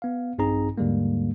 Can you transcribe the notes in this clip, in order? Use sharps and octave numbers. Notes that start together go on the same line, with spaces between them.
B3 F5
A#1 G2 C4 D#4 G#4 A#5
D#2 G#2 D3 G3 G#3 A#3